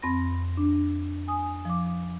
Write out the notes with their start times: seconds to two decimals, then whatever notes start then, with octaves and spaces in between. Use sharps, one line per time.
0.02 F2 C4 B5 A#6
0.57 D4
1.28 G#5 D#6
1.65 F3 D6